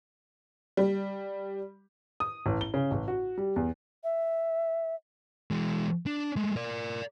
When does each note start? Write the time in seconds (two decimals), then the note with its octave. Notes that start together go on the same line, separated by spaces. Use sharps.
0.77 G3
2.20 D#6
2.46 A1
2.61 G7
2.74 C#3
2.91 A1
3.08 F#4
3.38 G3
3.56 E2
4.04 E5
5.51 E3 G#3
6.06 D4
6.36 G#3 A3
6.56 A#4 D5